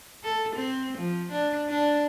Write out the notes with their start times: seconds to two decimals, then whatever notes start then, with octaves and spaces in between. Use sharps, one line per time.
0.24 A4
0.56 C4
0.98 F3
1.32 D4
1.69 D4